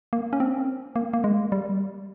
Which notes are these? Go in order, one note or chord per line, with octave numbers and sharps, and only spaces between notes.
A#3
C#4
C4
A#3
A#3
G#3
G3